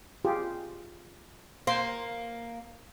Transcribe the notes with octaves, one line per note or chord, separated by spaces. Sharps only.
F4 G4 G#4
A#3 C5 C6